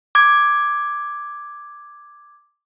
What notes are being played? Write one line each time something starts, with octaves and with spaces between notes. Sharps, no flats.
D6 G#6